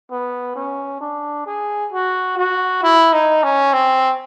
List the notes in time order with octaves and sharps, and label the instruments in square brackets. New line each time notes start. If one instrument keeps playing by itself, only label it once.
[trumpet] B3
C#4
D4
G#4
F#4
F#4
E4
D#4
C#4
C4